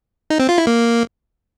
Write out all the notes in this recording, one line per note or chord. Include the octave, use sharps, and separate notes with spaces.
D#4
C4
F4
E4
A#3